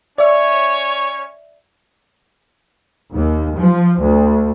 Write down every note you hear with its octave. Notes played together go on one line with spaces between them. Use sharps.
C#4 C#5 D5 E5
D#2
F3
D2